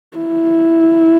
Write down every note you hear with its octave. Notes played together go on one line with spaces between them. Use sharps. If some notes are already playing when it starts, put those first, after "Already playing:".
E4